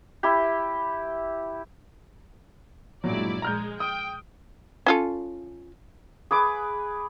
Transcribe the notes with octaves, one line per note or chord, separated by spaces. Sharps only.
E4 G4
G2 A#2 F#3 G#3 E4 D5
A#1 G#3 A#5 F6 G6
G5 D#6
C#4 F4 A4
G#4 B4 D6